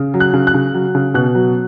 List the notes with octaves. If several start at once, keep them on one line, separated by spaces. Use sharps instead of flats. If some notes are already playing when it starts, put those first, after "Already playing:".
Already playing: C#3
F#3
F#6
C#3
F#6
C#3
F#3
C#3
B2 F#6
F#3